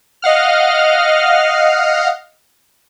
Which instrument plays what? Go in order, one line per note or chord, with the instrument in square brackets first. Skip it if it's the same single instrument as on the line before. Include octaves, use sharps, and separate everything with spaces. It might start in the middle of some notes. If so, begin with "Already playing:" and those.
[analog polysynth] D#5 F5 F#5 F6